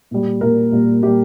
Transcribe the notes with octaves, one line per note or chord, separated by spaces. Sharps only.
A#2 G3
A#2 G3 A#4
A#2 G3
A#2 G3 G4